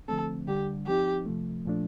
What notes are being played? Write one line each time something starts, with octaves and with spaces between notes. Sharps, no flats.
D3 F3 A3 C4 A4
D3 G3 D4 G4
F3 C4 D#4 G4
C3 F3 A3
A#2 F3 A3 D4